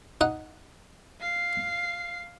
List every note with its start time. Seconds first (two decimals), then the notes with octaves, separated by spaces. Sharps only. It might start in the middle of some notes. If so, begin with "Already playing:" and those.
0.21 D#4 F#5
1.21 F5 C7